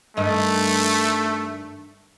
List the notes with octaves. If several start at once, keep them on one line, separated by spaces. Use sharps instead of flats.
G2 D#3 A3 D#5